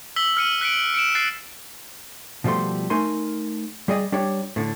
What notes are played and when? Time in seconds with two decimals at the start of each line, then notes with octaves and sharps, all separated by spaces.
0.16 E6 B6 F#7 G7
0.37 F6 C#7 D#7 F#7
0.61 F#6 B6 C#7 D7 F#7
0.94 C#7 D7 E7
1.15 F#6 A6 C7 C#7
2.44 B2 F3 G3 A3 C6
2.90 A3 D#4 A#4 G#5 C6
3.88 G3 G#4 D5 D#5
4.12 G3 D4 G4 C#5
4.56 A2 D3